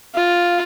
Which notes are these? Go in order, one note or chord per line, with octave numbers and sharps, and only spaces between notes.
F4